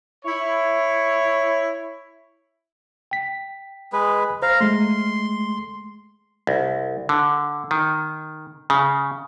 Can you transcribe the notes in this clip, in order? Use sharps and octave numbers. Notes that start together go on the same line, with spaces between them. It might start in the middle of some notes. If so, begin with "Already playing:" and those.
E4 C#5
G5 B6
G#3 B4
C5 F5 A#5
G#3 A3 C6
C2
D3
D#3
C#3